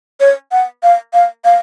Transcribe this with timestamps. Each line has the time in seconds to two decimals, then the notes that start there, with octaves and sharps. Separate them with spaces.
0.20 C#5
0.52 F#5
0.83 F5
1.13 F5
1.45 F5